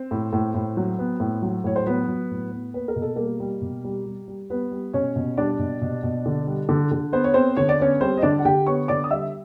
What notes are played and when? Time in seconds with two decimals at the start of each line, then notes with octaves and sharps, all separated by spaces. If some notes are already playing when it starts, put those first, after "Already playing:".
Already playing: C4
0.11 A2
0.33 A2
0.54 A2
0.77 F#3
0.99 B3
1.20 A2
1.42 F#3
1.64 A2 C#5
1.76 C5
1.86 F#3 B3 B4
2.08 F#3
2.31 A2
2.52 B3
2.74 A#3 B4
2.88 A#4
2.96 B2
3.02 A4
3.16 G3 A#3 A#4
3.40 G3
3.61 B2
3.84 G3
4.05 G3
4.28 G3
4.50 G3 B3 B4
4.72 G3
4.93 B2 C#4 C#5
5.16 B2
5.37 G3 D4 D5
5.59 B2
5.81 B2
6.03 B2
6.26 D3
6.47 G3
6.69 D3
6.92 D3
7.13 B3 C5
7.24 C#5
7.34 B3 C4 C5
7.56 D3 C#5
7.69 D5
7.79 B3 C#4 C#5
8.01 G3 C4 C5
8.17 D#5
8.22 D3 D4 D5
8.39 F#5
8.45 D3 G4 G5
8.67 B3 C#5 C#6
8.88 D3 D5 D6
9.04 D#6
9.10 G3 E5 E6